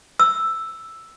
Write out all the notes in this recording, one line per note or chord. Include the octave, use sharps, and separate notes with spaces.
E6